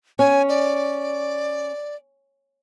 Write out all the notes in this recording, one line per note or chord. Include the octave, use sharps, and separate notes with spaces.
C#4 G#5
D5